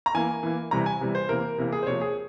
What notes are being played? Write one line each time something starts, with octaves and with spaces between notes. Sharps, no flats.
A#5
E3 A#3 G#5
E3 A#3
C3 E3 G3 A#5
G#5
C3 E3 G3
C5
C3 E3 A#3 A#4
C3 E3 A#3
G#4
C5
C3 F3 A#3 C#5
G#4